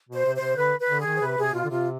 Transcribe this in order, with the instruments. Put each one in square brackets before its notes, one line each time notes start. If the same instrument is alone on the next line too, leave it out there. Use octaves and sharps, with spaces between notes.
[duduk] B2 [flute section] C5
[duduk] C3
[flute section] C5
[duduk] C3
[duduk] D3 [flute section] B4
[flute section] B4
[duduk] D3
[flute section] G#4
[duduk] D#3
[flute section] C5
[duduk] C3 [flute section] B4
[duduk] C3 [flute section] G#4
[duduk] B2 [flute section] F4
[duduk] D3
[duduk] C3 [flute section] F4